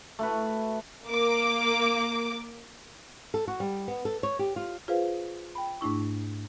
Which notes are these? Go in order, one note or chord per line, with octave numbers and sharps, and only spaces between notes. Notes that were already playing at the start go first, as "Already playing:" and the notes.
A3 F#4 B4
A#3 D6
A4
F#4
G3
B3
A4
C#5
G4
F4
F4 G#4 B4 C5 F5
G5 B5
G#2 A3 D4 E4 C#6